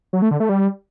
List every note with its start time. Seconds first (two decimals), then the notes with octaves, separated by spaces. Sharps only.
0.13 F#3
0.22 A3
0.31 D3
0.40 A3
0.49 G3